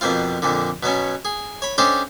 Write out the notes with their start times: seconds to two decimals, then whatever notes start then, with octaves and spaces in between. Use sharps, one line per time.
0.01 F2 B2 A#3 C4 F4
0.42 F2 A#2 D3
0.83 B2 F#3 B3 C#4
1.25 G#4
1.62 C#5 B5
1.78 C#4 D4 G4 A4 C5 D#5